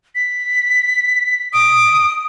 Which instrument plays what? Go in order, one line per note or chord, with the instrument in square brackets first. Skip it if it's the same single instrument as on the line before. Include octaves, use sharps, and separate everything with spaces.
[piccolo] B6
[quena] D#6 [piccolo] D7